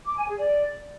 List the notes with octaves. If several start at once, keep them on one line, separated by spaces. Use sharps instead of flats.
D6
G#5
G#4
D5